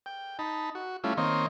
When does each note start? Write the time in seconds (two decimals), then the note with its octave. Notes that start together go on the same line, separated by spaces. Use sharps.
0.06 G5
0.39 D#4 A5 B5
0.75 F#4
1.04 G3 A3 C#4 E4 F4
1.17 D#3 A#3 C4 C#5 D#5 C6